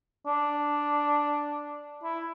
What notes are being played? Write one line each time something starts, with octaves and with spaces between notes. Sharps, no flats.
D4
E4